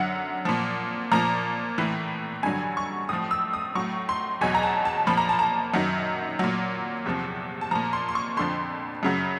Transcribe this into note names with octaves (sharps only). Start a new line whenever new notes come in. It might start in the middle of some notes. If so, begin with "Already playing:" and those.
Already playing: F#2 D3 F#3 F#5
A#2 F3
A#2 F3 A#5
A2 E3
G2 D3 F#3 G#5
C#6
A2 F3 D#6
E6
D#6
A2 F#3 C#6
C6
E2 B2 F#3 G#5
A#5
A5
A5
A#2 F3 B5
A#5
A5
A#5
F#2 D#3 F#3
A#2 F#3
E2 C3 F3
A5
A#2 F3 A#5
C6
C6
C#6
F2 D3 F3 C6
F#2 C#3 F#3